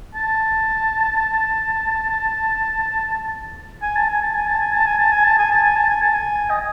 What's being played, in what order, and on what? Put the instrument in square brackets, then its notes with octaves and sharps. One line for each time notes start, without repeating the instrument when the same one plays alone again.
[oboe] A5
G#5
A5
G#5
A5
G#5
A5
G#5
A5
G#5
A5
G#5
A5
G#5
A5
G#5
A5
G#5
A5
G#5
D#5